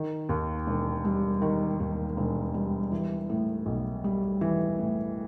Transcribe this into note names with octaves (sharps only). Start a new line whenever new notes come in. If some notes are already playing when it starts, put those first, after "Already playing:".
Already playing: D#3
D#2
E1
G3
D#3
D#2
E1
G3
E3
A2
B1
G3
E3
A2